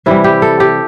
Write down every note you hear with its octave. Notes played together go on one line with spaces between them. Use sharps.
C3 E3 G3 E4
G4
A4
G4